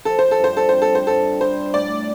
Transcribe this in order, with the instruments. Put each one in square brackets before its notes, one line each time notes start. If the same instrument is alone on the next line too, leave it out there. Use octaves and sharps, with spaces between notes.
[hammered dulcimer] F3 [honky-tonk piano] A4
[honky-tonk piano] C5
A4
[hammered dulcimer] G2 [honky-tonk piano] C5
[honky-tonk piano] A4
[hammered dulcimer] C4 [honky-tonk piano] C5
[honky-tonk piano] A4
C5
[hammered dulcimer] G2 [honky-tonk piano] A4
[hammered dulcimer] G3 [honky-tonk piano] C5
[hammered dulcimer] A2 [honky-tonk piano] D5